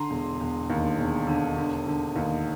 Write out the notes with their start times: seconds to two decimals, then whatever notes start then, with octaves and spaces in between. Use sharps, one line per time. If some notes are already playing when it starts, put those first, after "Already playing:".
Already playing: D3 A#5 C6
0.10 E1
0.40 E1
0.70 D#2
0.98 E1
1.27 D3
1.57 D3
1.86 D3
2.16 D#2